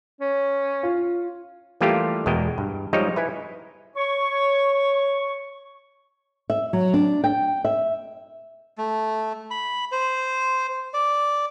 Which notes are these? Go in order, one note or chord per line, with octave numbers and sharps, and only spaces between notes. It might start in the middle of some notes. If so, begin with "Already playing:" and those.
C#4
F4
E3 G3 A3 A#3 F4 G4
E2 B2 G#3 A#4 G5
G2
F3 G3 G#3 D#4 C#5 D#5
E4 B4 G#5
C#5 C#6
E5
F#3
D4
G5
E5
A3
B5
C5
D5